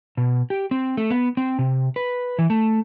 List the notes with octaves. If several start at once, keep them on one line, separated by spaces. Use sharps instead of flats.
B2
G4
C4
A3
B3
C4
C3
B4
E3
A3